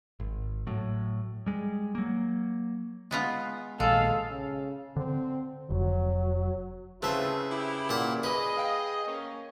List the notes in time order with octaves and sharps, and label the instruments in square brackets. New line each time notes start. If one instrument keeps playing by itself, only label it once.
[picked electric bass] G#1
A2 F#3
G3 G#3
F#3 A#3
[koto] G#3 B3 F4
[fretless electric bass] A#1 D#3 [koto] G#3 [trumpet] A4 [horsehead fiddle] F5
[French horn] C#3
[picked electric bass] D3 [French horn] C4
[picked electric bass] F1 [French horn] F#3
[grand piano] C#3 B4 A5 [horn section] A3 E4 F4 [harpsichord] C4 E5
[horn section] E4 G4
[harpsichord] A#2 F#5
[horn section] G#4 D#5 [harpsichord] B4 [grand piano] B5 D#6
[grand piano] F5 G5
[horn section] A#3 C#4